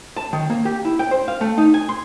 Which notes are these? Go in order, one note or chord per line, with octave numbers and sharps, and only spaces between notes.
A5
D#3
A#3
G4
E4
G5
C5
F5
A3
D#4
G#5
C6